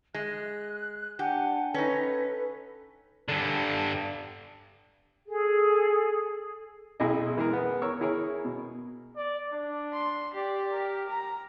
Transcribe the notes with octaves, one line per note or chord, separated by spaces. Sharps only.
G#3 F#6
D4 G4 F#5 G#5
C#4 D#4 A4 B4
G2 D3
G#4 A4
B1 E4 G#4 D#5
E3 G#3 G#4 A#4
B3
A#4 C#5 C#6 E6
E4 G#4 A#4 C#5
B2
D5
D4
C6
G4 D5
A#4
A#5